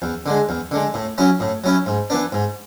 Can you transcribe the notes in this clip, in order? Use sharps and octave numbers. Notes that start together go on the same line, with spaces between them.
E2
D3 G#3
E2
D3 G#3
A2
F#3 C#4 E4
A2
F#3 C#4 E4
G#2
E3 B3 D4
G#2